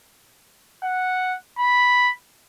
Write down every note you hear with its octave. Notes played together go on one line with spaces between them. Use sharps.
F#5
B5